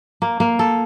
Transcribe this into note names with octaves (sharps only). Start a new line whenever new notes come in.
A#3
A#3
A4